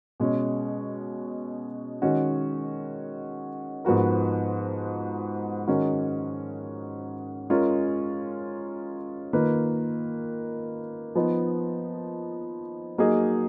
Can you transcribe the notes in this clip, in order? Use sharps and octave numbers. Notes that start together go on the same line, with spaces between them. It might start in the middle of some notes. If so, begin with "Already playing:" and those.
B2 G#3 C#4
D#3 G#3 C#4 F#4
G#2 F3 B3 F#4 A#4
D#3 G#3 C#4 F#4 A#4
G#3 C#4 F4 A#4
D#3 A#3 F4 B4
F3 B3 D#4
F#3 A#3 D#4 G#4